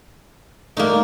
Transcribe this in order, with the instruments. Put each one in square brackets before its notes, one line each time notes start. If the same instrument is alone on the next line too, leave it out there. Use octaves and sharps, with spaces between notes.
[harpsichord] A3 D4 [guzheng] A#3 D#4